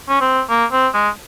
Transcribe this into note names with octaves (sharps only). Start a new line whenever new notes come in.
C#4
C4
A#3
C4
G#3